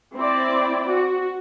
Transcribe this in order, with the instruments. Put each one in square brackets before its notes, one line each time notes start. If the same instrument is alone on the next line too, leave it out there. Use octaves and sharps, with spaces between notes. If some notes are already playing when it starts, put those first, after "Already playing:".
[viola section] C4 E4 D5
F#4